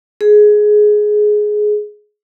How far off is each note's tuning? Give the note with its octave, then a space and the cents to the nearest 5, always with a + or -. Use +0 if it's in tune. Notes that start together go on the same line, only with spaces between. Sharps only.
G#4 +15